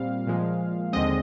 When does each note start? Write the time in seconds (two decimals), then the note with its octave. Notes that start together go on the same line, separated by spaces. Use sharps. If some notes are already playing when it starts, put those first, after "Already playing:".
Already playing: A#2 G3 C4 F5
0.27 A#2 F3 G#3
0.93 D#2 D3 G#3 C4 D#5